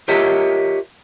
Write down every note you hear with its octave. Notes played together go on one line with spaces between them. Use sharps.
F4 G4 A#4 C#5 D#5 E5